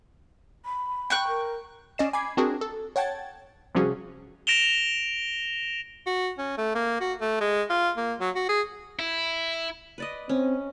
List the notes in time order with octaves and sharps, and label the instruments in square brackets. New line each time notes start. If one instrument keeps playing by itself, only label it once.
[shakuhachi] B5
[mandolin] G5 C#6 F#6
[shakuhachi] A#4
[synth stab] C#4 D5 D#5 C7 E7
G#5 B5 D6 G#6 C7
C4 D4 F#4 G#4 A#4
A4
C#5 F#5 G5 A5 G#6 A6
C3 F3 G3 C#4 F#4 G#4
[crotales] A#6 D7 E7 F7 G7
[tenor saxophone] F#4
C#4
A3
A#3
F#4
A3
G#3
F4
A#3
F#3
F#4
G#4
[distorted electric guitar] E4
[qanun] B4 D5 D#5
[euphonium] C4 [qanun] C#4